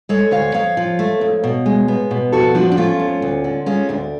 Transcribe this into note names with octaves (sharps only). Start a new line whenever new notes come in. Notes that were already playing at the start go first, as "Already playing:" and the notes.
G#3 A4 C#5
D2 C#5 F5
F2 C#5 F5
F3
A3
F2
B2
G#3
B3
B2
F2 F#4 A4
F3 D4 F#4
D4
A3 C#4 F4
F2
D2
D3
G#3 C#4 F4
D2 D4